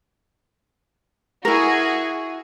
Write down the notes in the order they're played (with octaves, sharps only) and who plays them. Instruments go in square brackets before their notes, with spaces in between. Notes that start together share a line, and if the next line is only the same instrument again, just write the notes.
[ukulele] E4 A#4 [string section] F#4 G#4